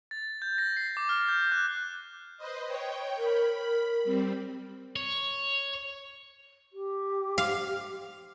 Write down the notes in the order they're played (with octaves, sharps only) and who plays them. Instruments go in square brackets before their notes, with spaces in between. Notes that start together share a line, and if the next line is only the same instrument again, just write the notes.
[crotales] A6
G6
A#6
C7
D6
F6
G6
F#6
[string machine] B4 C5 D#5
C#5 G5
[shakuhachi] A#4 [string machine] B5
[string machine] G3 C4
[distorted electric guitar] C#5
[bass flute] G4
[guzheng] F5